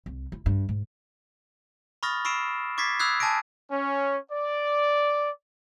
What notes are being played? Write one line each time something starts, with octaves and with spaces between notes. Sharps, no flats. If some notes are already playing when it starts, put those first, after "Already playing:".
C2
E4
G2
G#2
B5 C#6 D#6 F6 A6 A#6
B5 C#6 E6 C7 D7 E7
C#6 D6 G#6 A6 B6 C7
B5 D#6 E6 F#6 G#6 C7
G#5 A5 D#6 A#6 D7
C#4
D5